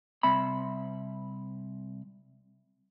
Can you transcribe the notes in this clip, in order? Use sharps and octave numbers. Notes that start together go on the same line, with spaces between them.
C2 C4 E5 B5